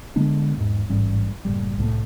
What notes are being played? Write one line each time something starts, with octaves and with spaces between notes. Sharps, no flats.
D3 G#3 B3 D4
E2 G#2
A1 G#2 G3 C#4
F#1 A2 G3
C2 A2 A3